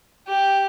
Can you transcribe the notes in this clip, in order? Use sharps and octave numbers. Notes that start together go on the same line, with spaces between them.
G4